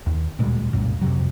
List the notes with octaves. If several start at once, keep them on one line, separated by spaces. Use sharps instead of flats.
D#2
D2 A#2 G3 G#3
C2 F#2 A#2
F2 C3 F#3